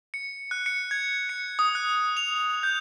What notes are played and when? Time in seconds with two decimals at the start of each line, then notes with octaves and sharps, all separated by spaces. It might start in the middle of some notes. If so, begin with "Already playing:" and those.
0.14 C#7
0.51 F#6
0.66 C#7
0.91 G#6
1.29 C#7
1.59 D#6
1.75 F#6
2.17 F7
2.63 G6